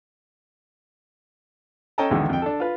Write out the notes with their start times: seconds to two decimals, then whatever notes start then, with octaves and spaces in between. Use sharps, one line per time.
1.98 C#4 A4 D#5 G5 A5 A#5
2.10 B1 E2 D3 D#3 G#3
2.29 F2 G5
2.42 D4 A4
2.60 F4 B4